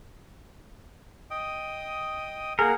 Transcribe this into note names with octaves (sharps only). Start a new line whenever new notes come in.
D#5 G5 D#6
A#3 G#4 A#4 F#5